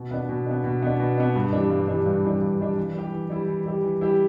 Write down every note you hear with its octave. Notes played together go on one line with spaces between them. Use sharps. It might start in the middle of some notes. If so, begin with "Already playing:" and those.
Already playing: B2
B3 D4
B2
B3 D4
B2
B3 D4
B2
B3 D4
G2
E3 G3 D4
G2
E3 G3 D4
G2
E3 G3 D4
G2
E3 G3 D4
E3
G3 E4 G4
E3
G3 E4 G4
E3
G3 E4 G4
E3
G3 E4 G4